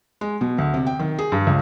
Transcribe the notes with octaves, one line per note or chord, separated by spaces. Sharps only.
G#3
B2
D2
C3
G5
D#3
G#4
G2
C#2